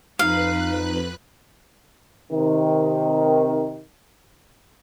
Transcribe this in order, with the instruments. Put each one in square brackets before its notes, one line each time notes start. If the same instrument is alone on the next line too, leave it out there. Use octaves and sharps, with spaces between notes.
[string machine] F2 B4 F#6 [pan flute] D#4 [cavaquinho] F5
[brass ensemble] C3 D#3